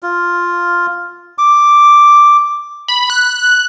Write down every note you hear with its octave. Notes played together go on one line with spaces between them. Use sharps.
F4
D6
B5
F#6